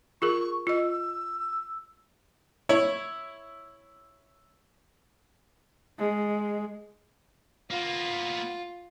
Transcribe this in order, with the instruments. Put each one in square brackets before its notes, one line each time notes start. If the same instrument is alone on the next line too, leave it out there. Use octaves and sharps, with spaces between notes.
[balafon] F4 G#4 A#4 [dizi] C#6
[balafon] F4 D#5 [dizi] E6
[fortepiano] E4 C#5
[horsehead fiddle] G#3
[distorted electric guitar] A#3 B3 [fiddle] F4